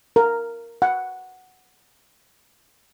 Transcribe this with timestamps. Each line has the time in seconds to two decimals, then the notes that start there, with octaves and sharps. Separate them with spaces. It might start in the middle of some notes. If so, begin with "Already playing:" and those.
0.16 A#4
0.82 F#5